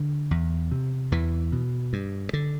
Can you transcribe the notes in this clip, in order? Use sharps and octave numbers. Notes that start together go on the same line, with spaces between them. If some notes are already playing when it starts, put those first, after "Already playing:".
Already playing: D3
E2
C3
E2 E3
B2
G2
D3